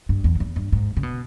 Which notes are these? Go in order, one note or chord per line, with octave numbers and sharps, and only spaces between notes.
G2
E2
G2
E2
G2
G#2
C#3
B2